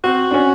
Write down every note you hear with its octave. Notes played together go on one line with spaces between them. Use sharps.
C4 F#4
D4
C#4